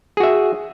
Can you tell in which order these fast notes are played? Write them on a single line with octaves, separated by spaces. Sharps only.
G#4 F#4 E5